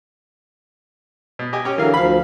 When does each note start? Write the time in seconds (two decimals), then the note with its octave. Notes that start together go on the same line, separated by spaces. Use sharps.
1.39 B2
1.53 G4 D#5 G#5
1.65 C#4 G4
1.78 D3 E3 F#3 A#4 F5
1.94 D2 F3 F5 B5